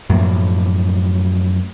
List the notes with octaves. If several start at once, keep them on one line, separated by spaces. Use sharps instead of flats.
F#2 A2 F3 A#3